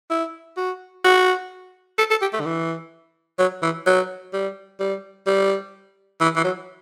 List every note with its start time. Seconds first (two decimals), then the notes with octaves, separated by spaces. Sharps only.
0.10 E4
0.57 F#4
1.04 F#4
1.98 A4
2.10 A4
2.21 G4
2.33 A3
2.40 D3
2.45 E3
3.39 F#3
3.62 E3
3.86 F#3
4.33 G3
4.80 G3
5.27 G3
6.21 E3
6.36 E3
6.44 F#3